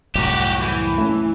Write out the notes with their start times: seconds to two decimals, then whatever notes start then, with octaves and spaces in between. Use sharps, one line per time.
0.15 C2 F#2 A2 F#4 G4
0.60 E3
0.98 A3 C#4